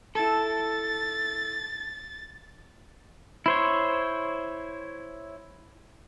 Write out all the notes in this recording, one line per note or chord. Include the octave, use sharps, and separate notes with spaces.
E4 A4 A6
E4 C5 C#5